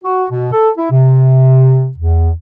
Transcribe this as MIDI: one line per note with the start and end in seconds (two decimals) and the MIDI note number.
0.04 0.26 66
0.30 0.48 47
0.52 0.70 69
0.78 0.89 64
0.91 1.91 48
1.98 2.31 40